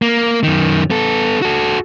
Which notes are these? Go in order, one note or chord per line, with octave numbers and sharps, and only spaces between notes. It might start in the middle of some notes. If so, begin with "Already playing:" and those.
A#3
F#2 D#3
B3 A4
F#4 A4